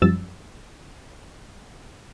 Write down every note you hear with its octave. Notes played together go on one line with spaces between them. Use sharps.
F#2 F3 G3 E6 A6